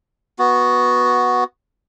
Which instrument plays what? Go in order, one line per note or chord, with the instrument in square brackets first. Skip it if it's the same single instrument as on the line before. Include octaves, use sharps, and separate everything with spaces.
[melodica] B3 F#4